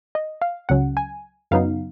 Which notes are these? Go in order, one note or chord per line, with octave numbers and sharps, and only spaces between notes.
D#5
F5
C#2 C#3 F#3 C#4 F#5
G#5
F#2 C#3 F#3 B3 D#4 F5